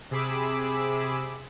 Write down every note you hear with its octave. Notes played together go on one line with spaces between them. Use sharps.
C3 G#4 B5 D6 E6